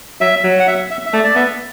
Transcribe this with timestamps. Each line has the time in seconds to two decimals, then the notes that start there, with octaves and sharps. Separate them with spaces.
0.21 F#3 E5
0.44 F#3
0.59 F#5
0.67 E5
0.90 E5
1.06 E5
1.14 A3 D5
1.24 D5
1.36 B3 E5